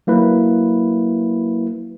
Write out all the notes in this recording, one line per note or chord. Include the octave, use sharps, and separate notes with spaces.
F#3 A#3 E4 B4